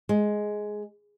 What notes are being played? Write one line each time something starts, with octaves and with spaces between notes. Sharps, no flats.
G#3